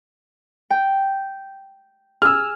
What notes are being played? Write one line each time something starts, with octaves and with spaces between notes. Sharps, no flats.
G5
G#4 E6 F6